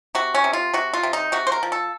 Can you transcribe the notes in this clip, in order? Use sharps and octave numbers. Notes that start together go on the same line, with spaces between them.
C3 F#4
C#4
C3
F4
C3 F#4
F4
C3
D#4
C3 F#4
C5
A#4
F3
A4